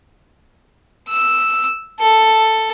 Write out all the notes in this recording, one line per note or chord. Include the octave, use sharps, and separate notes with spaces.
E6
A4